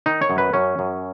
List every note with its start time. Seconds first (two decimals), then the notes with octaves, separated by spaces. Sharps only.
0.06 D#3 D#4
0.22 C#5
0.30 F#2
0.38 B4
0.53 F#2 C#4
0.79 F#2